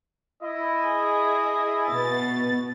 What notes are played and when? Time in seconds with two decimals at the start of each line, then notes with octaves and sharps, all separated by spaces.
0.42 E4 D#5
0.85 G#4
1.92 B2 B3 A6